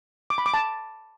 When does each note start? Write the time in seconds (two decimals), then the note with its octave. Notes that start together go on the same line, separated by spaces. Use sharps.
0.30 D6
0.38 B5
0.46 D6
0.54 A5